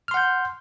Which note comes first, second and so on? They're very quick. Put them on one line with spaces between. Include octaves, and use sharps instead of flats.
F6 C6 F#5 G6